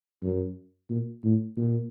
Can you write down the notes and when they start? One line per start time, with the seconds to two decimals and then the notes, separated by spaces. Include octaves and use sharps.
0.23 F#2
0.90 A#2
1.24 A2
1.57 A#2